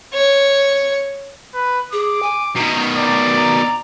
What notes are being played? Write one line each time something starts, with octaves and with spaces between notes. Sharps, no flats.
C#5
B4
G#4 D6
G#5
B2 D#3 A#5
D5 A#5
A#5